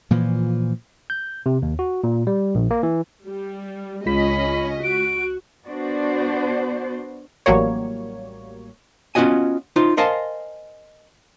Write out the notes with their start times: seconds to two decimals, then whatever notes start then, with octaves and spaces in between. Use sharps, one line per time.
0.11 A#2 E3 F3
1.10 G6
1.46 C3
1.62 D#2
1.79 F#4
2.04 A#2
2.27 G3
2.55 A#1
2.71 A#3
2.83 E3
3.27 G3
4.06 C#2 G#3 C#4 F4 D#5 B5 B6
4.83 F#4 D7
5.65 B3 D4 F#4 C5 D5
7.46 A1 F#3 G3 A#3 C#5
9.15 B3 C#4 F4 F#4 D#5 G#5
9.76 D#4 F4 C5
9.97 A#4 C5 D#5 F5 G#5 A5